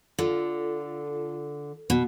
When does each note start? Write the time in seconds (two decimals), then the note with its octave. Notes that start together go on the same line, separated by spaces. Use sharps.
0.19 D3 F4 A4
1.90 B2